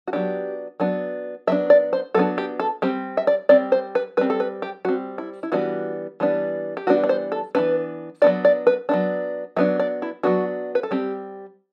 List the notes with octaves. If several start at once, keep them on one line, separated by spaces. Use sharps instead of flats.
F#4
F#3 B3 D4 G4
F#3 B3 D4
F#3 B3 D4 E5
D5
C5
F#3 B3 D4 A4
G4
A4
G3 C4 G4
E5
D5
G3 C4 D5
C5
B4
G3 C4 B4
A4
B4
G4
G3 C4 F#4
E4
E4
E3 G3 B3 D4 F#4
E3 G3 B3 D4
G4
E3 G3 B3 D4 F#4
D5
C5
A4
E3 G3 B3 D4 B4
F#3 B3 D4 D5
D5
B4
F#3 B3 D4
F#3 B3 D4 E5
D5
E4
F#3 B3 D4 F#4
B4
A4
G3 C4 G4